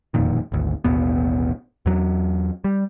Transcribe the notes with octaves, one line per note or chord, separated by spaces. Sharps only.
E1 F2 A#2 D#3
G#1 D2
A1 D#2 B2 B3
E2 F#3
G3